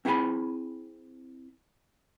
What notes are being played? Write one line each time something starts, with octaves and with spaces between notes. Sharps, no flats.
C4 E4 G#4 F#5 G#5 B5